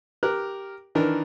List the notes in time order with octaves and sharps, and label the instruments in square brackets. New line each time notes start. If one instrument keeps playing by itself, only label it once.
[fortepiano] G4 A#4 F#6
D#3 E3 D4 A#4